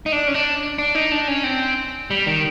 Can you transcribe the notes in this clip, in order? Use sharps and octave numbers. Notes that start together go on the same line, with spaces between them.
D#4
D4
C#4
D4
D4
D#4
D4
C#4
C4
G3
D#3